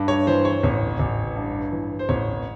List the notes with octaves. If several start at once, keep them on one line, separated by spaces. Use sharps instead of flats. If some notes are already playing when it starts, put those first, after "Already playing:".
Already playing: G2
C#5
E3 C5
C#5
A1 C#5
A1
G2
E3
C5
A1 C#5